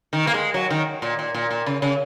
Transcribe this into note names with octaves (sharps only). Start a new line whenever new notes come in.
D#3
A#3
G#3
F#3
D#3
A#2
A#2
A#2
A#2
C#3
C#3